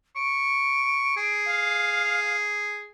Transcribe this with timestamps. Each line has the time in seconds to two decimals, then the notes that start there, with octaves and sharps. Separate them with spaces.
0.16 C#6 D7
1.17 G#4
1.46 F5